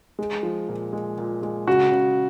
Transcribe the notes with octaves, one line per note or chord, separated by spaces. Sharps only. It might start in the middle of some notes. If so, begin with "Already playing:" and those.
G#3
F3
A#2
G#3
A#2
G#3
C#3 F#4
C#3